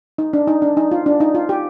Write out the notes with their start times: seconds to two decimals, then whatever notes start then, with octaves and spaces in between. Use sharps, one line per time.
0.18 D#4
0.33 D4
0.47 D#4
0.62 D4
0.77 D#4
0.91 F4
1.06 D4
1.20 D#4
1.35 F4
1.49 G4